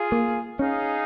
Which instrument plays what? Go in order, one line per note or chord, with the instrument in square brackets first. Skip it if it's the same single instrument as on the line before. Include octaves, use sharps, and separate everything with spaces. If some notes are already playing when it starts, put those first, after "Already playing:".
Already playing: [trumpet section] F4 G#4 F5
[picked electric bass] A#3
[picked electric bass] C#4 [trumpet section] D#4 G#4 F5